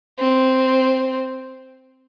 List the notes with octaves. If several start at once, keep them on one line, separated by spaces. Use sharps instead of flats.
C4